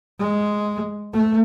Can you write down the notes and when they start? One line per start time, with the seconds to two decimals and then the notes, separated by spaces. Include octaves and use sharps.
0.20 G#3
1.13 A3